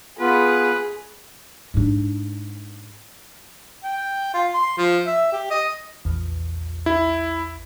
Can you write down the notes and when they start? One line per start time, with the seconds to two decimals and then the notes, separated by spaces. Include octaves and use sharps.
0.20 B3 F4 G#4 B4
1.74 G#2 D4
3.84 G5
4.34 F4
4.54 C6
4.78 F3
5.07 E5
5.32 G4
5.51 D#5
6.05 A#1 E2
6.86 E4